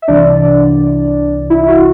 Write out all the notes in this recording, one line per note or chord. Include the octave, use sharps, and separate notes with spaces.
E5
C2 C3 E3 D4 D5
E4
F#4